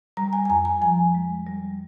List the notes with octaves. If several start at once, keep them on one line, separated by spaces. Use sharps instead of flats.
G3 A#5
G#5
G#5
F2 A#5
G#5
F3 G#5
G#3
G3